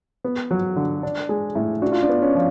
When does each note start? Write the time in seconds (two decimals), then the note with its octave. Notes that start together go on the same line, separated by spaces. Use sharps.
0.24 B3
0.51 F#3
0.76 D3
1.03 D4
1.29 G#3
1.55 A2
1.82 D4 F#4
1.92 F4
2.02 D4
2.09 B3
2.22 C#4
2.35 F3